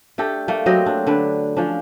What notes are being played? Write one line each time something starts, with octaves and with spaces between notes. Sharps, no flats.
A3 D4 G4 A4
A3 A#3
F#3 C4 G4 D#5
D4
D3 D4 B4
F3 C#4 D4